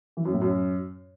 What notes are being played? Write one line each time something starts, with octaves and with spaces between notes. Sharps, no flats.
E3
F#2
A2
F#2